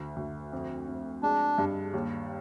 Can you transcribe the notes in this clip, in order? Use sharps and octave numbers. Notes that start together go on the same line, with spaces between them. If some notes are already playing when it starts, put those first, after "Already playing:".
Already playing: D2
D2
F2
F2
G#3 D4
G2
D#2